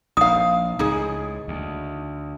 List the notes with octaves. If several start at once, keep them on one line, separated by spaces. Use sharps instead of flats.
A#1 D#4 F5 D#6
C#2 A2 D#4 G#4
D2